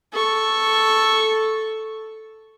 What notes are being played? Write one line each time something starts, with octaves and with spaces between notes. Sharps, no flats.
A4 C#6